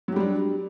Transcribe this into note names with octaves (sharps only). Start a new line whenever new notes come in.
F#3 G3 D4 G4